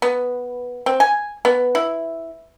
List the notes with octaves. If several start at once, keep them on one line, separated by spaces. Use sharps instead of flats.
B3
C4
G#5
B3
E4